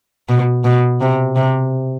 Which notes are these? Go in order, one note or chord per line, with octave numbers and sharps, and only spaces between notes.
B2
B2
C3
C3